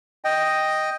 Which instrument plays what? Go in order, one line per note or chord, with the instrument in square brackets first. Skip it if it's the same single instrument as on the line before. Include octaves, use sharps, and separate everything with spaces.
[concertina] D#5 G5